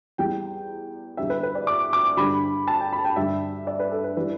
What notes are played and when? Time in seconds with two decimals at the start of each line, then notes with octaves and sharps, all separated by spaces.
0.18 E2 E3 G3 G5
1.17 E2 D3 G3 E5
1.30 B4
1.43 B4
1.55 D5
1.67 D6
1.93 D6
2.17 G2 D3 G3 B5
2.68 A5
2.80 G5
2.93 B5
3.04 G5
3.16 G2 D3 G3 E5
3.67 D5
3.80 B4
3.91 A4
4.04 B4
4.17 E3 G3 B4